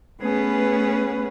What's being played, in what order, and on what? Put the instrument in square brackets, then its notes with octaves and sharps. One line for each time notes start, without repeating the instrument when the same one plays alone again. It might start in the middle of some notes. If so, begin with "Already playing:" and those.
[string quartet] A3 B3 C#4 G#4 B4